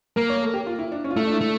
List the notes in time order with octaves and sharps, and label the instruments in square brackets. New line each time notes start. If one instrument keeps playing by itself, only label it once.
[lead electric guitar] A#3 [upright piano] A#4
[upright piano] C#5
A4
G4
F4
E4
D4
C#4
F4
[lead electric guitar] A3 [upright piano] E4
[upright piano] D4
E4
[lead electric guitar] A3